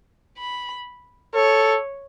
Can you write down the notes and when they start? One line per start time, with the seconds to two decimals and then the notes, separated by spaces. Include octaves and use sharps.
0.38 B5
1.34 A4 C#5